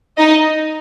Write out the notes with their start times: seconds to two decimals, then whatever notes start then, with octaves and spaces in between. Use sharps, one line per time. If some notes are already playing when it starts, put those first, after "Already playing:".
0.18 D#4 D#5